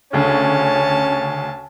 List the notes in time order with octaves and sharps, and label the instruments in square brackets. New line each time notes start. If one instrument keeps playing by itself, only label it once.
[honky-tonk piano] D2 C#3 [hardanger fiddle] C#4 A5